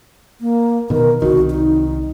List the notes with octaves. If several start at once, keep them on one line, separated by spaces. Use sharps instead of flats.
A#3
B2 D#3 A#4
C2 D#3 F#4
D#4